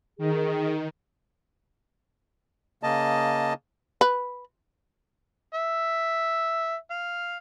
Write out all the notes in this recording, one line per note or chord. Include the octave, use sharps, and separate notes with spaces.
D#3 G#4
C#3 A#3 D#5 A5
B4
E5
F5